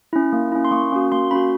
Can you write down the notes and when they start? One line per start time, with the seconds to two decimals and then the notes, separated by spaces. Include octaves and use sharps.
0.13 C#4 E4
0.33 A#3
0.52 C#4 E4
0.65 C6
0.71 A#3 C#6
0.92 C#4 F#4
1.12 A#3 C6
1.31 C#4 F#4 B5